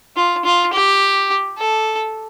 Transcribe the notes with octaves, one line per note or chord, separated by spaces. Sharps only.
F4
F4
G4
A4